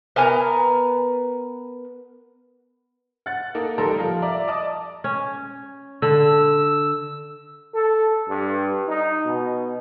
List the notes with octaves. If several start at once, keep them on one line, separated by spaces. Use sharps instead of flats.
B3 A#4 G#5 A#5
F#5 F#6 A6
A#3 D#4 A4
A1 G3 A4 A#4 A#5 C6
F3 F4
D5 E5 A#5
D5 D#5 A5 D6 D#6
C#4
D3 E6
A4
G2
D#4
B2